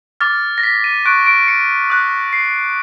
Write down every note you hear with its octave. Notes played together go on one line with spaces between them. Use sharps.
D6 F6 A6
A#6
B6
D#7
C#6 F#6 D7
D7
C#7
D#6 F#6
C7